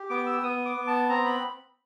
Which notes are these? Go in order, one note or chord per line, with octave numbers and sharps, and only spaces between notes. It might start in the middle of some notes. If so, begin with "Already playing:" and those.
Already playing: G4
B3 D6
E6
B3 D#6
D6
B3
A5
C4 A#5
B5